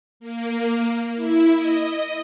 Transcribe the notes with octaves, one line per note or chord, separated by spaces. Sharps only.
A#3
E4
D#5